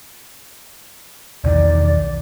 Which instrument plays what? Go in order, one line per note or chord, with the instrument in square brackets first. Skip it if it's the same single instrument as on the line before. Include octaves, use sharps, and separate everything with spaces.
[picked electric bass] B1 E2 D#3 [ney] D5